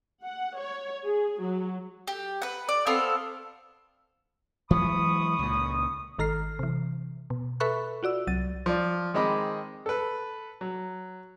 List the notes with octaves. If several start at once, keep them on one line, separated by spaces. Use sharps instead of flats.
F#5
C#5
G#4
F#3
G4
B4 F#5
D5
B3 C4 A4 F5
E3 F#3 G#3 B5 C#6 D#6
C#2 A#2
G#1 D#3 A4 A#5 F6 C7
C3 E3
B2
A4 B4 E5 B5 C#6 F#6
F4 F#4 D5 E6
C2 F#3 A6 D#7
F3 D5
D#3 G#3 C4 D#5 B5 D6
A4 B4
F#3